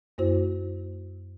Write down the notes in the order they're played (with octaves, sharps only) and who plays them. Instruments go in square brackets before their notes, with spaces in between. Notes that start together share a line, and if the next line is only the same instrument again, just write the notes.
[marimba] F#2 A#3 E4 F#4 C5